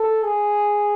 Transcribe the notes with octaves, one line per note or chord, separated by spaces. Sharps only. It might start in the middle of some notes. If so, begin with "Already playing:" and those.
Already playing: A4
G#4